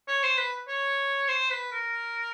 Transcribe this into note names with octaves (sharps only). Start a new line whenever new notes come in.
C#5
C5
B4
C#5
C5
B4
A#4